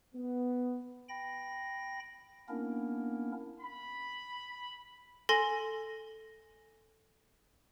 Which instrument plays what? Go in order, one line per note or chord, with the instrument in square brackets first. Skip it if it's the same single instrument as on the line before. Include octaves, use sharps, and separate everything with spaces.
[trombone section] B3
[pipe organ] G5 B5 A#6
A#3 B3 C#4 D4 E4 A#4
[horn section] B5
[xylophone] A4 G#5 C6 A#6